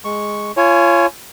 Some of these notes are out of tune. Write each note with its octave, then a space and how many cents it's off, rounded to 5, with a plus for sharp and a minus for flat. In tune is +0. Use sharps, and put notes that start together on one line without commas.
G#3 +0 C#6 +0
F4 -30 C#5 +0 G#5 +20